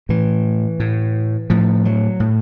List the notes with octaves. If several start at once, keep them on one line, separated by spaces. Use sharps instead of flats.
A2 E3
A2
A2 F3
F#3
A2